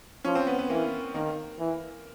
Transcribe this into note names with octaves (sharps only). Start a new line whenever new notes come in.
F3 C#4
C4
B3
B3
E3 A#3
D#3 A#3
E3